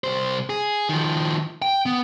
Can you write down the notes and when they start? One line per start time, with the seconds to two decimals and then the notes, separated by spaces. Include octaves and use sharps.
0.04 C2 C5
0.50 G#4
0.89 D#3 F3
1.62 G5
1.86 B3